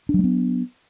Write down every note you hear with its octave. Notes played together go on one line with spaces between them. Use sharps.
F#3 G#3 B3 D4